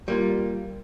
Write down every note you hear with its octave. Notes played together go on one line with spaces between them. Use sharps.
G3 A#3 F4